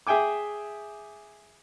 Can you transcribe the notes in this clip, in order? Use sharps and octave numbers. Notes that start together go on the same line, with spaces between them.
G#4 E5 G5 G#5 D6